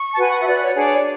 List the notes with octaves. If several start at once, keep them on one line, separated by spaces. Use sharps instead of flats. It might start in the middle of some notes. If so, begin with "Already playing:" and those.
Already playing: C#6
A5
F#4 B4 G#5
F#5
E5
F#4 B4 D5
C#5
D4 G#4 C#5 D5